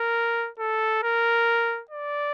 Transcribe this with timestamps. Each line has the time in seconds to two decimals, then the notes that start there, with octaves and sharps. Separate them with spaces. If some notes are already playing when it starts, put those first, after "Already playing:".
Already playing: A#4
0.59 A4
1.03 A#4
1.91 D5